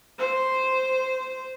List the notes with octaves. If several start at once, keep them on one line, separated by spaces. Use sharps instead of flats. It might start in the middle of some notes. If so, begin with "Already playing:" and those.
C5